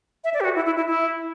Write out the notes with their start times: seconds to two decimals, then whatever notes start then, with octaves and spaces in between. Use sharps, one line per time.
0.24 E5
0.34 D5
0.41 G4
0.45 F#4
0.56 E4
0.66 E4
0.77 E4
0.87 E4